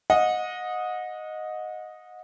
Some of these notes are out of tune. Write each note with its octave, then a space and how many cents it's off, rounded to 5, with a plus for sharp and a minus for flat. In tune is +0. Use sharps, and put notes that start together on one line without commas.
D#5 +0 F#5 -30